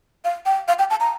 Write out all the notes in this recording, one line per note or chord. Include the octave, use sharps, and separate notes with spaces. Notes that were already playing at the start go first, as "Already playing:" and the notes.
F5
G5
F5
G5
A5
A#5